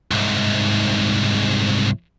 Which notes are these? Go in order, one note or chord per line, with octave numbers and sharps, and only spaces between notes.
C2 G#2